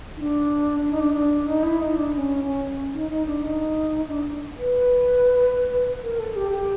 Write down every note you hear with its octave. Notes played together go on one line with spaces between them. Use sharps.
D#4
D4
D4
D#4
D4
D4
D#4
E4
D#4
D4
D4
C#4
C#4
D#4
D#4
D4
D#4
D4
B4
A#4
A4
G4
G4